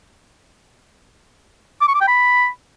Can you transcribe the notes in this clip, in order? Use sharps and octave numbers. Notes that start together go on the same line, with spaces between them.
D6
C#6
D6
G5
B5